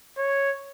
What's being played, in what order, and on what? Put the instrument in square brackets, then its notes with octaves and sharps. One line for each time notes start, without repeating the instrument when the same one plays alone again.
[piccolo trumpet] C#5